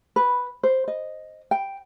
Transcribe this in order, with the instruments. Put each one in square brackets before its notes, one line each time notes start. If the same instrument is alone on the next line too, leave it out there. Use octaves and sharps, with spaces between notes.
[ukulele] B4
C5
D#5
G5